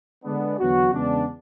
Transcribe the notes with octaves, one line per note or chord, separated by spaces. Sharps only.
D3 G#3 B3 D4
E2 D3 F#3 B3 F#4
E2 C#3 G#3 B3 D4